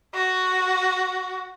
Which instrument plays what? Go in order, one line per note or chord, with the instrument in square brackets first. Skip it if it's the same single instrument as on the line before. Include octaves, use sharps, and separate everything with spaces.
[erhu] F#4